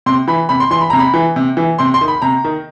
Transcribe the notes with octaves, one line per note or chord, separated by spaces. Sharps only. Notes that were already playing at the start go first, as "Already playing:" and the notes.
C3 C6
E3 B5
C3 B5
C6
E3 C6
B5
C3 A#5
B5
E3
C3
E3
C3 C6
C6
D#3
B5
C3 A#5
D#3